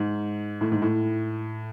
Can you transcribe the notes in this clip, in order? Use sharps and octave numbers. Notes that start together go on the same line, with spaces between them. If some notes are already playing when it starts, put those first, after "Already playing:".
Already playing: G#2
A2
G#2
A2